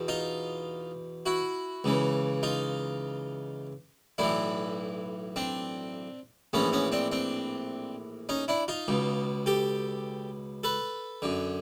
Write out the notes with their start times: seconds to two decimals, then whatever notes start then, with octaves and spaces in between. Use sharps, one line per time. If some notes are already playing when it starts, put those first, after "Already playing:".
Already playing: E2 B2
0.08 D#4 F4
1.26 E4 F#4
1.84 C#2 C#3 E3
2.43 D#4 F4
4.18 B1 A2 E3 D4 E4
5.36 C4 D4
6.53 A#1 A2 E3 B3 C#4
6.73 B3 C#4
6.92 C4 D4
7.12 C4 D4
8.29 C#4 D#4
8.48 D4 E4
8.68 D#4 F4
8.88 C#2 B2
9.46 G4 A4
10.64 A4 B4
11.22 F#2 D3